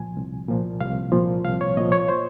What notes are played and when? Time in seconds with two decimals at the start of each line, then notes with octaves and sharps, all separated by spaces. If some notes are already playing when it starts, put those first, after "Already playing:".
Already playing: C2 A#2 F3 G#5
0.17 C2
0.48 A#2 F3
0.81 C2 F5
1.12 A#2 F3
1.44 C2 F5
1.61 C#5
1.77 A#2 D#5
1.81 F3
1.92 C#5
2.08 C5